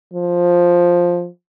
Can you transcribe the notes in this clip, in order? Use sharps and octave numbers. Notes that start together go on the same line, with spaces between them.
F3